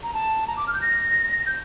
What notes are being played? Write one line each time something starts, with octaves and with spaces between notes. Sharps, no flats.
A#5
A5
A#5
D6
F6
G6
A#6
G6